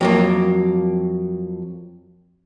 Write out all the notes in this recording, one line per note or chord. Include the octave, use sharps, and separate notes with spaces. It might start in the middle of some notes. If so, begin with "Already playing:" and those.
F2 F#3 A#3